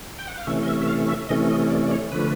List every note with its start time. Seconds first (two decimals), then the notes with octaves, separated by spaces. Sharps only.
0.19 G5
0.27 F#5
0.37 F5
0.47 C3 E3 A3 C#4 E5
0.63 D#5
0.67 E5
0.82 E5
0.88 F5
1.09 E5
1.29 C3 E3 A3 C#4 D#5
1.50 D#5
1.70 D5
1.87 D5
1.91 C#5
2.12 D3 F3 A3 B4